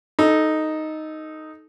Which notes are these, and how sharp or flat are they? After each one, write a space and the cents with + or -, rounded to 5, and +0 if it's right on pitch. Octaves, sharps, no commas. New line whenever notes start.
D#4 +0 A4 -15